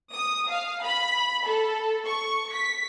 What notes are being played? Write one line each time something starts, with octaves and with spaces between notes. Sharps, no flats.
D#6
F5
B5
A4
C#6
B6